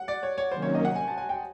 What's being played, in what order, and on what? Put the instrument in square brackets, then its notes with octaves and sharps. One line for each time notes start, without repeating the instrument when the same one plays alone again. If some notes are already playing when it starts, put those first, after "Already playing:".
Already playing: [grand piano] F#5
D5
C#5
C#5
[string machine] C3 D#3 F#3 A#3 C#4 [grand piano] C5
[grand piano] C#5
D#5
F#5
G#5
A5
G#5
G5